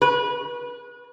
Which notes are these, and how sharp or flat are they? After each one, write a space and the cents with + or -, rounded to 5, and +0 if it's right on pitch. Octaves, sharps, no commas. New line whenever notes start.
B4 -30